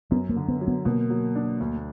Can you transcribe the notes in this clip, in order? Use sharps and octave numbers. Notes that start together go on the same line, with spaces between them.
F#2 B3
A#3
D3
B3
F#3
B3
B2 A#3
F#3
D4
D2